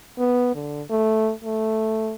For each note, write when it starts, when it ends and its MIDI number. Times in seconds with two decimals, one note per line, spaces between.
0.19 0.53 59
0.55 0.82 50
0.90 1.31 57
1.45 2.15 57